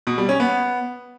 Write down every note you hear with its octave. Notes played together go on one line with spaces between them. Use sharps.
B2
G3
C#4
B3